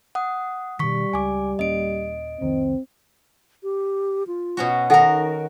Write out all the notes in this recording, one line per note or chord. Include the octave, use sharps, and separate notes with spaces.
F#5 D#6
B2 D#3 G3 C#6 B6
C#2 G#5 D6
D#1 A#3 C#4 D#5 D7
F1 C2 D#3 C4
G4
F4
B2 C#4 F#4
D#3 D#4 F#4 A4 A#4 F#5